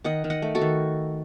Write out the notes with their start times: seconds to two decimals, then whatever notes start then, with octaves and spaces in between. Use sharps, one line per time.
0.04 D#3 D#5 F#5
0.24 D#3
0.30 D#5 F#5
0.42 A3
0.55 F#4 A4
0.61 D#3